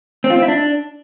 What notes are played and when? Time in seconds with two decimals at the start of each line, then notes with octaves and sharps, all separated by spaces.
0.24 C4
0.30 F4
0.36 C4
0.42 E4
0.48 D4